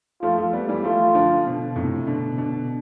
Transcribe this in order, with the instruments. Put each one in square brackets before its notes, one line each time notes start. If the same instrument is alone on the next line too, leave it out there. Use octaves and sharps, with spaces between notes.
[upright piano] F3 A3 [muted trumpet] F4
[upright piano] F3 A3
G3 B3
E3 G3
[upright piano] F3 A3 [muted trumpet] F4
[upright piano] D3 F3
B2 D3
A2 C3
B2 D3
B2 D3